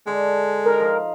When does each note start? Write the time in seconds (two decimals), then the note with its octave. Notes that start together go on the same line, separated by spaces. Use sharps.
0.07 D3 G#3 A4
0.65 D#4 A#4 A#5
0.80 F3 F5